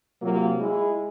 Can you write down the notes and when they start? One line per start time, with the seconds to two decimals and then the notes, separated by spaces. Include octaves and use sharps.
0.21 C3 F#3 A#3 F4
0.60 G#3 E4 G#4